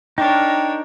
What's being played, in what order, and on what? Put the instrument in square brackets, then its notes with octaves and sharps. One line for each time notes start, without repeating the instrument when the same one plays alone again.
[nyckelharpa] D4 C#5 [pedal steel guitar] D#4 A#4 [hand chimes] G5